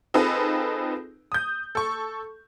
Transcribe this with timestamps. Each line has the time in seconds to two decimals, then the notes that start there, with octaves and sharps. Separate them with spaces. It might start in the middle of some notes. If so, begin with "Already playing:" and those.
0.14 C4 D#4 F4 G#4 A4 B4
1.32 D#6 G6
1.75 A4 C#6